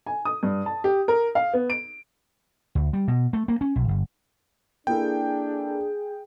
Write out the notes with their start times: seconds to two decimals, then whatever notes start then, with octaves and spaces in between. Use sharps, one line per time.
0.06 G#5
0.25 D#6
0.43 G2
0.66 A5
0.84 G4
1.08 A#4
1.35 F5
1.53 B3
1.70 D7
2.75 D2
2.93 G3
3.08 B2
3.33 A3
3.48 A#3
3.61 C#4
3.76 B1
3.88 G1
4.87 A#3 D4 E4 G#4 A4 G5